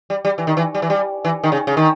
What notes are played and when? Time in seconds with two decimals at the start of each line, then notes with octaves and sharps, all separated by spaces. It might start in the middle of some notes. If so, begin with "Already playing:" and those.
0.10 G3
0.25 G3
0.38 E3
0.47 D#3
0.57 E3
0.75 G3
0.82 E3
0.90 G3
1.25 E3
1.44 D#3
1.52 C#3
1.67 C#3
1.77 D#3